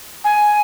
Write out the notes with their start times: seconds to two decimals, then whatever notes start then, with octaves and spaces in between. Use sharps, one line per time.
0.24 G#5